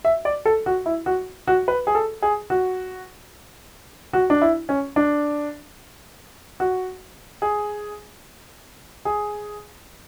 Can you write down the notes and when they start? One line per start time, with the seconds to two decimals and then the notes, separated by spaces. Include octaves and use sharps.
0.05 E5
0.25 D5
0.45 A4
0.66 F#4
0.86 E4
1.06 F#4
1.48 F#4
1.68 B4
1.87 G#4
1.95 A4
2.22 G#4
2.50 F#4
4.13 F#4
4.30 D4
4.42 E4
4.69 C#4
4.96 D4
6.60 F#4
7.42 G#4
9.05 G#4